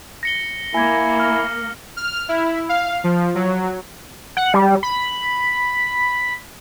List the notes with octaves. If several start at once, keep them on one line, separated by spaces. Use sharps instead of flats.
A#6 C#7 G7
A#3 E4 G#5 G#6
F6
F6
E4
F5
F3
F#3
F#5
G3
B5